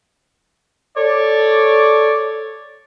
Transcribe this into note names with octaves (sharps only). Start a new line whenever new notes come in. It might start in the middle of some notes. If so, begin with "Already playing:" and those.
A4 C#5 D5